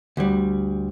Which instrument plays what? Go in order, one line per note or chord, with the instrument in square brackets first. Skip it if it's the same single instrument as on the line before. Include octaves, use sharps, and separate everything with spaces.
[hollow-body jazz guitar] D2 G3